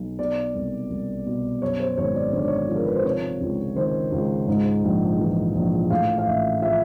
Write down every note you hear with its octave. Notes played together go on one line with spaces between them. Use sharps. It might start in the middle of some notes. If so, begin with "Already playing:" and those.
Already playing: B1
B2 D5
C2
C2
B2
F#2 C#5
C5
G#1 C#5
D5
D3 C#5
D5
C#5
F3
A#4
B4
C5
C3 C#5
C#2
D#3 C5
C#2
G#2
A#1
E3
A#1
A2 F5
F5
A1 E5
F3 E5